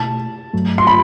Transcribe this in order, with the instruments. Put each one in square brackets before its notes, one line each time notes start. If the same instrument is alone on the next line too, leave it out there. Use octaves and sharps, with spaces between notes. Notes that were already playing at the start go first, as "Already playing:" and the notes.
Already playing: [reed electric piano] B2 A3 E4 [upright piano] A5
[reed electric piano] G2 F#3 A3
[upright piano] C6
B5